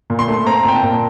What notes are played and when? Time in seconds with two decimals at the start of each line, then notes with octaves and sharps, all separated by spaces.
0.10 A#2
0.19 C6
0.28 A3
0.47 C4 A#5
0.64 A#2 G5
0.74 A5
0.83 A#2